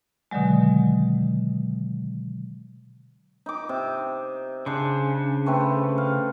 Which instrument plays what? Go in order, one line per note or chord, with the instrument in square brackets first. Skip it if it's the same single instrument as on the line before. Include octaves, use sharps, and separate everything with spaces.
[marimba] B2 D3 D#3 F#3 G#3
[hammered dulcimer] D#4 D6
C3
[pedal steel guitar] C#3 [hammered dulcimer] D4 C5
[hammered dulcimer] A3 C4 B4
F5